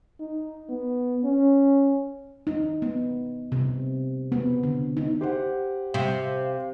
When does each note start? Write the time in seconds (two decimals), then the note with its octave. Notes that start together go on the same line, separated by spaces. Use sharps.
0.20 D#4
0.69 B3
1.24 C#4
2.47 D#4
2.82 B3
3.52 C3
4.32 B3
4.63 D3
4.97 D#4
5.21 G4 C5 F#5
5.94 C3 F5